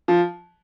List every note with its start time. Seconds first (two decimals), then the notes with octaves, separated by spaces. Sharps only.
0.08 F3